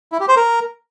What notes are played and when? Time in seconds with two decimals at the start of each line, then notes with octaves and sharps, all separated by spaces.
0.12 E4
0.20 G4
0.28 C5
0.36 A#4